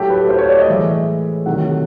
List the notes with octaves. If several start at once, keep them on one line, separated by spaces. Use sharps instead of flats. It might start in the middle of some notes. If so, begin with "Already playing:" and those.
Already playing: A2 F#3 A3 G4
B4
C5
C#5
D5
D#5
A2 E3 G#3 E5
C3 D#3 F#3 A3 F#5